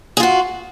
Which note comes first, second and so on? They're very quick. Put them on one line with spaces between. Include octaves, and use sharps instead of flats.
G#4 F4 F#4